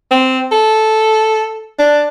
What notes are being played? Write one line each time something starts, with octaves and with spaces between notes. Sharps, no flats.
C4
A4
D4